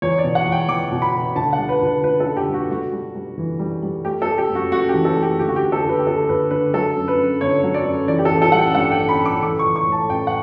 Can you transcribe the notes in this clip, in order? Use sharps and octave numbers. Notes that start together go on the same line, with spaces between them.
E2 C#5
B2 D5
F#5
E2
G5
E2 D6
B2
B5
B2
D2 A5
F#5
G3
B4
D2
B4
D2 B4
A4
D3
G4
G3
F#4
G3 F#4
G3
G3
E3
G3
G3
A3 G4
A4
A3
G4
F#2
F#4
F#2 F#4
E3 G4
A4
A3
G4
D2 G4
F#4
G4
D2
A4
D2 B4
G4
D2 A4
D2 B4
D3 B4
F#3 A4
F#2
B4
F#2
G1 C#5
F#3
D5
F#2
E3 D5
G4
A4
A1
A4
G3 F#5
G5
G2 F#5
G5
A1
B5
A1
D6
E3 D6
C#6
E3
C#6
A2
A5
A1 G5
F#5